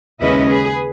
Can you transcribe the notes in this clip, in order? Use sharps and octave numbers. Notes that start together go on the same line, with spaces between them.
D#2 C#3 G#3 C#4 E4 B4 D#5
G#4 B4